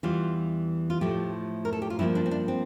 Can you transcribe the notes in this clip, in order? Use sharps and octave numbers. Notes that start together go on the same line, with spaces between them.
E2 E3 G3 F4
F4
A2 F3 A3 G4
A#4
A4
G4
F4
G2 F3 A#3 E4
D4
C4
D4
C4